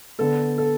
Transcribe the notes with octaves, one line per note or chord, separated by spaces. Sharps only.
D3 B3 A4
A4